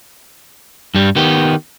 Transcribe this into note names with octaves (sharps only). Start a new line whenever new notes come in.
G2 G3
D#3 B3 G4